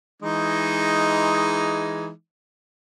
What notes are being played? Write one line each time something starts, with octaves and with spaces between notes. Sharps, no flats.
E3 G#3 D#4